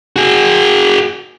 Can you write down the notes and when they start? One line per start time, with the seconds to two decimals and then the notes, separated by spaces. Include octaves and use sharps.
0.16 F#4 G#4